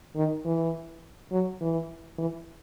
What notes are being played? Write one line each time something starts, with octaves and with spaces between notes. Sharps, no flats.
D#3
E3
F#3
E3
E3